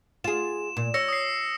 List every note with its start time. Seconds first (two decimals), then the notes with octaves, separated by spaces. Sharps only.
0.24 F4 G#4 E7
0.77 A#2
0.94 C#5 E6 A#6 C#7
1.08 D#6 C7